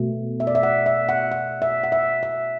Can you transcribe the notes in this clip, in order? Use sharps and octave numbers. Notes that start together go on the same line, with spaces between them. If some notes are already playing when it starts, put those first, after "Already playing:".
Already playing: B2 A3
E5
D5
E5
F#5
E5
F#5
F#5
E5
F#5
E5
E5